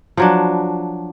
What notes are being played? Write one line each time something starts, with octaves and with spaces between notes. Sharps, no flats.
F3 F#3 D4